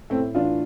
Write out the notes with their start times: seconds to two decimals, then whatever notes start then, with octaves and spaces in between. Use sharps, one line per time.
0.10 A2 A3 C4
0.35 E3 D4 F4